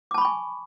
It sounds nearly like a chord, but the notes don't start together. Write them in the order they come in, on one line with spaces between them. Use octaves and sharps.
D6 A5 B5 C#6 G#5